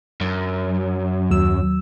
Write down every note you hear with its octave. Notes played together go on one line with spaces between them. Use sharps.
F#2
D#2 F#3 E6